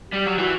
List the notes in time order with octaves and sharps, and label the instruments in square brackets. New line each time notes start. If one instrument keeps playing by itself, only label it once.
[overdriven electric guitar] G3 [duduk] G4
[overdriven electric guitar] F#3
[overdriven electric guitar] E3 [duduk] F#4